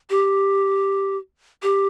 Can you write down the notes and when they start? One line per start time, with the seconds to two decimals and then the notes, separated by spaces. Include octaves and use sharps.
0.10 G4
1.62 G4